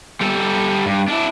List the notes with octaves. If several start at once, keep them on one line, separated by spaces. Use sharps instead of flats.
G3 A4
G2
D4 E4